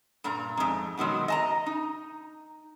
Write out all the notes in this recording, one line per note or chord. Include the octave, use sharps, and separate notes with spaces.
G2 A#2 A#5
F2 G#2
B2 D#3 F#3 G#3
D#5 A5 A#5
D#4